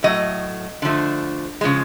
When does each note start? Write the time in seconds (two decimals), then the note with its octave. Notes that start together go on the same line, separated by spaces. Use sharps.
0.03 A2 F#3 A3 D#5
0.82 D3 F3 A3
1.61 C#3 F3 G#3